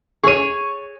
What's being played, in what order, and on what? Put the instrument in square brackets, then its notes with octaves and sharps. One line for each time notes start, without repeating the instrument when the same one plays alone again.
[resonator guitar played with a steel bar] G#4 C#5 [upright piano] C#6 D#7